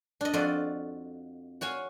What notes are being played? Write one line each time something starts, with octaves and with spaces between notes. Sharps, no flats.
D4 D#5
F2 F4 F#4 D5 D#5
F#4 C#5 F5 G#5